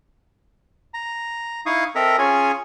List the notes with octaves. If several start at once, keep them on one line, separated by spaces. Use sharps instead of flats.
A#5
D#4 E4 F5 C#6 D#6
C4 A4 A#4 D#5 E5 A#5
C#4 F4 G#4 C#5 G#5